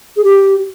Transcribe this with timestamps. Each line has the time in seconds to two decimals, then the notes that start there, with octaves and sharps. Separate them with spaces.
0.17 G#4
0.24 G4